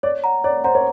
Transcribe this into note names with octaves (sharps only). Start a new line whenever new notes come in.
C#5 D5
F#5 A#5
C#5 D5
C5 F#5 A#5
C#5